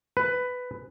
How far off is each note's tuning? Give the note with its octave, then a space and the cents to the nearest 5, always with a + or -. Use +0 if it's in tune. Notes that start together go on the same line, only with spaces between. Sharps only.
B4 +10